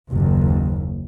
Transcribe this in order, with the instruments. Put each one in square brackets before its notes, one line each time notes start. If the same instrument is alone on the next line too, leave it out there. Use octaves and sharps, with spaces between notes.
[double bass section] F#1 D#2